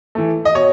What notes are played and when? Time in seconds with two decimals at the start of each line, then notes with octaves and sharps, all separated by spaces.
0.15 E3 A3
0.45 D#5
0.55 B2 C#5